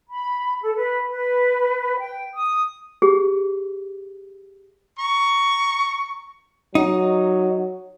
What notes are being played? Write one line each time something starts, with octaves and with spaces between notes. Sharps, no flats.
B5
A4
B4
B4
G5
D#6
G4 G#4
A#5 C#6
F#3 D#4